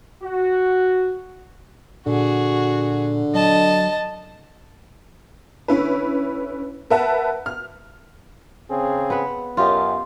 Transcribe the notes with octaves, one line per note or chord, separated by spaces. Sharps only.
F#4
A#2 D3 F#4 G#4
F#3 D#5 A5
D3 C#4 E4 B4
A#4 B4 E5 F#5 A5
F6
C#3 C4 G#4
B3 B4
F#2 F4 G4 D#5